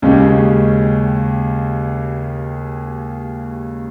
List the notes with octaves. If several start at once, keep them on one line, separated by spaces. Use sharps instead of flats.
D#2 C#3 G#3 C#4 G4